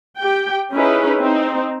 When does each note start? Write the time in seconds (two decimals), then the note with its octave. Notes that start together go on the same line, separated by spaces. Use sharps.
0.18 G4 G5
0.73 C#4 D#4 E4 G#4 B4
1.21 C4 D#4